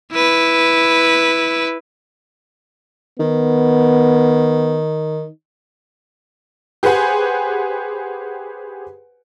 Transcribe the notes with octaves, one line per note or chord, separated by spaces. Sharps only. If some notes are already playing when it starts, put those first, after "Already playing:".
E4 B4
D#3 B3
G4 G#4 B4 C5 F#5 G#5